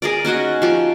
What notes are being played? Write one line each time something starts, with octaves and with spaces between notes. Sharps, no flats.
G#4 A#4 D5
C#4 D#4 F#4 D#5
F3 G4